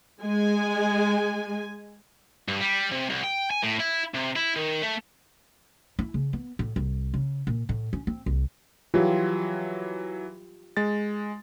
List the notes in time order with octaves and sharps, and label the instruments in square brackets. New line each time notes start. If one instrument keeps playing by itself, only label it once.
[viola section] G#3 G#5
[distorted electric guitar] G2
G3
C3
C2
G5
G#5
A2
E4
C3
E4
D#3
A3
[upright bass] E4
C#3
B3
A2
C2
C#3
A#2
A2
C#4
C4
C2
[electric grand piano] E3 F#3 [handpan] F4 G4
[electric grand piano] G#3 A6